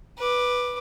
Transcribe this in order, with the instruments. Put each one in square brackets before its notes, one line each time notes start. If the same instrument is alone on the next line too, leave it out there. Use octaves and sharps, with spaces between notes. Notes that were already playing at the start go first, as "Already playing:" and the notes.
[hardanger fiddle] B4 D6